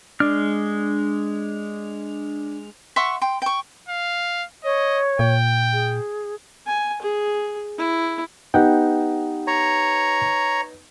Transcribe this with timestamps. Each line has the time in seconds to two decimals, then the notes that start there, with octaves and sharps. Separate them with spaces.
0.20 G#3 D4 F6
2.96 E5 F#5 C6 C#6
3.22 G5 C6
3.42 G5 C#6
3.89 F5
4.64 C#5 D#5
5.19 A#2 G5
5.73 G#4
6.67 G#5
7.02 G#4
7.78 E4
8.54 B3 D#4 G4 F#5 G5
9.47 C#5 A#5